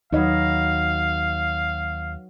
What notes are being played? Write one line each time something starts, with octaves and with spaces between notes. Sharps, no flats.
D#2 F#3 D#4 B4 C#5 D#5 F5